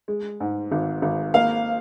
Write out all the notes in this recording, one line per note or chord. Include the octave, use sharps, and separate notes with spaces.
G#3
G#2
G#1
G#1
A#3 F5